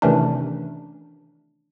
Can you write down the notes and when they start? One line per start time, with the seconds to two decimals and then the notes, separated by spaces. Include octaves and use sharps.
0.02 C3 D#3 E3 A3 C#4 D4